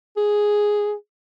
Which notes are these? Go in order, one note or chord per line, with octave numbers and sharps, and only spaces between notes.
G#4